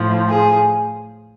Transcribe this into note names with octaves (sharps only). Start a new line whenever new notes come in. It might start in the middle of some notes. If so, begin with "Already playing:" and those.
Already playing: A2 F3
G#4